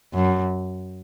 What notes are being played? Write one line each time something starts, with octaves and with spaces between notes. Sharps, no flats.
F#2